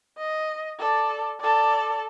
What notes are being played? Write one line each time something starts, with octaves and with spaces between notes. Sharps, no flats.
D#5
A4 D5
A4 D5